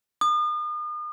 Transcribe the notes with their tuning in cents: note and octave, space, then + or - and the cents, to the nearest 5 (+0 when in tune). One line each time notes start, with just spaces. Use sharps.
D#6 -40